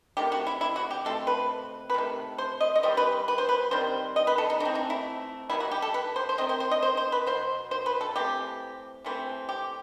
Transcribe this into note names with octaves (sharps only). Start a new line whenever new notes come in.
C3 D#3 A3 G4
F#4
E4
E4
F#4
G4
B2 A3 C4 A4
B4
B4
C3 D#3 A3
C5
D#5
D#5
E3 G3 C4 C5
B4
B4
C5
B4
D#3 G3 C4 C5
D#5
B4
A4
D#4
E3 A3 C4 D#4
D#4
E4
D#3 G3 B3 E4
F#4
G4
A4
B4
C5
C5
D#3 A3 C4 D#5
C5
C5
D#5
C5
C5
B4
B2 F#3 C5
C5
B4
A4
E3 A3 C4 G4
C3 E3 A3 C4
G4